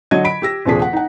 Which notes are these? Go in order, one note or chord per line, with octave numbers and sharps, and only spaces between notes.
D3 F#3 F#4 D#5 G#6
B5 B6 D7
G4 E6 A#6
D#1 C3 F3 D4 G#4 B6
F#5
D#4 F#5